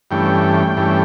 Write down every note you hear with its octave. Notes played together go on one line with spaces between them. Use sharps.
G2 E3 A3 C#4 G5
G2 E3 A3 C#4